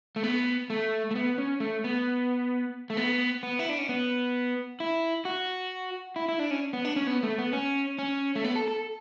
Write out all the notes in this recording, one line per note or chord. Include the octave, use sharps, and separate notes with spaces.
A3
B3
A3
A3
B3
C#4
A3
B3
A3
B3
B3
E4
D4
C#4
B3
E4
F#4
E4
E4
D4
C#4
B3
D4
C#4
B3
A3
B3
C#4
C#4
A3
B3
A4
A4